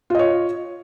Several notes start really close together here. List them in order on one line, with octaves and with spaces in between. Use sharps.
F4 D#5 C#5